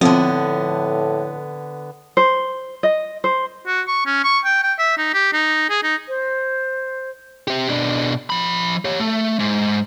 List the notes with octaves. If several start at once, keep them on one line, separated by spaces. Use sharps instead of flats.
A2 D3 F3 B3 C4
C5
D#5
C5
F#4
C#6
C#4
C#6
G5
G5
E5
D#4
G4
D#4
G#4
D#4
C5
C4 G4
B2 D4
F3 B5
G4 C#5
A3
G#2